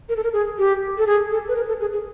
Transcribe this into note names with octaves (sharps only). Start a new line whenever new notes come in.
A#4
A4
A#4
G#4
G4
A4
G#4
A4
B4
A#4
A4
G#4
G#4